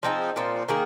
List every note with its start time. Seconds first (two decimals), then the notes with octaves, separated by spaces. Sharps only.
0.03 F3 C4 D#4 G#4
0.36 A#2 F3 C4
0.68 D#3 A#3 G#4